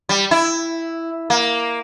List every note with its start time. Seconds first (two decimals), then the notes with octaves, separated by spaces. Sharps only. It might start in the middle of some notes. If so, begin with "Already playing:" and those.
0.09 G3
0.31 E4
1.30 A#3